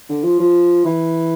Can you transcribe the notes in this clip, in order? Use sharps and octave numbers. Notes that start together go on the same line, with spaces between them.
D3
F3
F3
E3